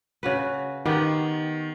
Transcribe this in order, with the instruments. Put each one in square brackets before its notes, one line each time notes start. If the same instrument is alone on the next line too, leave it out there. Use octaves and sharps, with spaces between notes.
[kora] C#3 F#4 B4
[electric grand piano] D#3 [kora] B3 G4